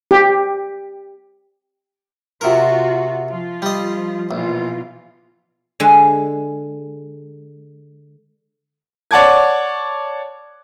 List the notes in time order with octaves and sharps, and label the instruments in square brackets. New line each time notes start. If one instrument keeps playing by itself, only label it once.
[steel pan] G4
[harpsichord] C3 A#4 [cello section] F4 F#4
[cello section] F3 F4
[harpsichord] G3 D#5
[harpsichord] A#1 [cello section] B2 E3 F4
[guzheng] D3 G#3
[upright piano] C#5 D5 F#5 A5 D6 G#6